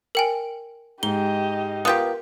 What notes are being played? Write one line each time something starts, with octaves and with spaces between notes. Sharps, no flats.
A#4 G5 G#5
G#2 G4 D#5 G7
B3 F4 G4 A#4 D#6 G6